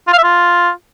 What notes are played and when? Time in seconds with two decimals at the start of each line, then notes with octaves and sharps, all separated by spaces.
0.07 F4
0.13 F5
0.18 E5
0.24 F4